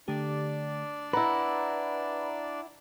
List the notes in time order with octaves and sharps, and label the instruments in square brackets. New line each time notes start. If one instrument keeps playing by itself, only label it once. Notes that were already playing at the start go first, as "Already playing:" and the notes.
[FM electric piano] D3 A3 G4 [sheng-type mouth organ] D4 D5
[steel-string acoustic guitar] E4 F#5 [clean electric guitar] B4 [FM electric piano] A#5